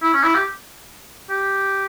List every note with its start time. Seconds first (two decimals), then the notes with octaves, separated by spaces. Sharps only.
0.02 E4
0.13 C#4
0.24 E4
0.34 G4
1.30 G4